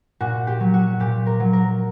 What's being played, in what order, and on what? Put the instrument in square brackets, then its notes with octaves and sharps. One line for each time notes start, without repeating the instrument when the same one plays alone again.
[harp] A#2 F#4
G4
F#3
F#4
A#2 G4
A#4
F#3
A#4